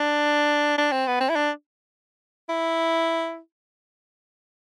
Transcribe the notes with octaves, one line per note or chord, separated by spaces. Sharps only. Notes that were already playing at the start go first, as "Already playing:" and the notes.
Already playing: D4
D4
C4
B3
C4
E4
D4
E4